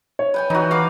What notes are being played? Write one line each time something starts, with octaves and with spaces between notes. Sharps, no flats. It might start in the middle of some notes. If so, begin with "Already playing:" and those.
C#5
B4 G5 G#5
E3 D#4 F#4
F5 B5 D6